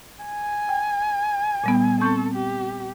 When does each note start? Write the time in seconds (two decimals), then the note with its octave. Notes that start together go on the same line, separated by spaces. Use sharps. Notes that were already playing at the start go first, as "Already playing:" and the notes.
0.25 G#5
0.69 G5
1.64 A#2 G3 B3
2.01 C4 A4 C#6 G6
2.34 G4